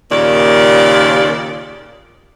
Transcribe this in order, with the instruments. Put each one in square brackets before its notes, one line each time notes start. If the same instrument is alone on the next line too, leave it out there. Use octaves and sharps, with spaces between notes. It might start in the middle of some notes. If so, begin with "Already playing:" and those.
[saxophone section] D#2 A#2 C#3 D5